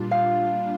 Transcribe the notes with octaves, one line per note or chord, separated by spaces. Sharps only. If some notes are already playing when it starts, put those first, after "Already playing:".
Already playing: A#2 G3 D4 F4
F5